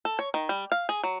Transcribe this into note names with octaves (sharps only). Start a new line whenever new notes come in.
A4
C#5
D#3
G3
F5
G#4
F#3